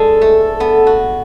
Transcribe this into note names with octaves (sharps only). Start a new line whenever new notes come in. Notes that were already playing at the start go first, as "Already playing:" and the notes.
Already playing: G#3 D4 A4
A3
B3
F#4